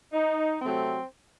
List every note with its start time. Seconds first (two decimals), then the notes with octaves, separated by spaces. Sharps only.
0.13 D#4
0.62 C3 F#3 A3 C4